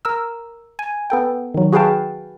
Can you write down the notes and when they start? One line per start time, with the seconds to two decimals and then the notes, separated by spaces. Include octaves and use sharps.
0.05 A#4 E6
0.79 G#5
1.10 B3 A4 G5
1.54 D#3 F#3
1.72 F#4 G#4 B4 F5 G5 A5